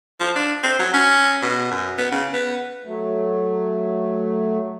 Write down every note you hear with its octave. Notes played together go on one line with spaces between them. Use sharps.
F3
D4
C4
F#3
C#4
B2
F#2
B3
C#3
B3
F#3 A3